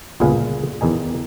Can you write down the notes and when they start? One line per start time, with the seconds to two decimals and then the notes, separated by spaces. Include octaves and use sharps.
0.20 G1 C#2 A#2 G#4 B4 F5
0.81 E2 D#3 D#4 G#5